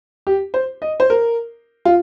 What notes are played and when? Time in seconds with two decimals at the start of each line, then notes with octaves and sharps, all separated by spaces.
0.27 G4
0.54 C5
0.82 D#5
1.00 C5
1.10 A#4
1.85 F4